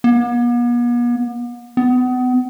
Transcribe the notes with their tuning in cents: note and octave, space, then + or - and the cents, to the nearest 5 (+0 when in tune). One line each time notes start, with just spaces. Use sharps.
B3 -45
B3 +30